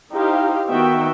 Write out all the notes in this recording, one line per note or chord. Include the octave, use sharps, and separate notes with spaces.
D#4 E4 G4 C5 F5
D#3 B3 F#4 E5 G5